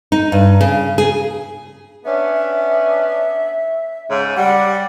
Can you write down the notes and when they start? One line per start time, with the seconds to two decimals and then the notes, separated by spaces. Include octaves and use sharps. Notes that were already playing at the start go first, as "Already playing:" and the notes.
0.12 D#4
0.32 G2
0.61 C#3
0.98 G#4
2.05 B3 C#4 D4 E5
4.10 G#2 C#3
4.37 G3 F#5